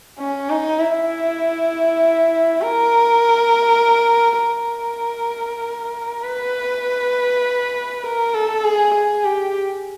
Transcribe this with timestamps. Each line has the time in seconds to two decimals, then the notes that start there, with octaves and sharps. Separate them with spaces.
0.19 C#4
0.50 D#4
0.79 E4
2.61 A#4
4.42 A#4
6.22 B4
8.04 A#4
8.34 A4
8.64 G#4
8.94 G#4
9.25 G4